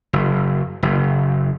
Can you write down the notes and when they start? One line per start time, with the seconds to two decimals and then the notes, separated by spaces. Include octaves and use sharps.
0.13 F#1
0.83 F#1